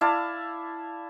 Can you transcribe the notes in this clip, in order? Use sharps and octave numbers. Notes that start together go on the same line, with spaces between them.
E4 D5 F5 A5